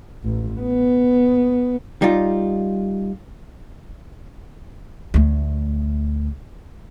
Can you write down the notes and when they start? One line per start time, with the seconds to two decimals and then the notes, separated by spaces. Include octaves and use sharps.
0.24 A1
0.61 B3
2.02 G3 D#4 F4
5.14 D2 A3